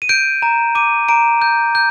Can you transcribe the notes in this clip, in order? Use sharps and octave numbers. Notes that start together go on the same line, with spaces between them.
D#7
G6 D7
A#5
D6 D#7
A#5 D7
G6
G6